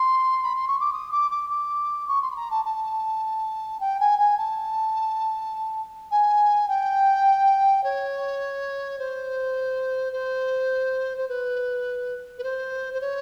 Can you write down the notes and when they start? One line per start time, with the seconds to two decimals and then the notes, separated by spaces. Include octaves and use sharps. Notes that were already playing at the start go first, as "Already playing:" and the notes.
Already playing: C6
0.43 B5
0.55 C6
0.67 C#6
0.80 D6
0.93 D#6
1.11 D6
1.30 D6
1.49 D6
2.07 C#6
2.21 C6
2.30 B5
2.36 A#5
2.50 A5
2.65 A5
3.80 G5
4.00 G#5
4.18 G#5
4.37 A5
6.11 G#5
6.68 G5
7.83 C#5
8.98 C5
10.12 C5
11.17 C5
11.28 B4
12.38 B4
12.43 C5
12.93 C5
13.00 C#5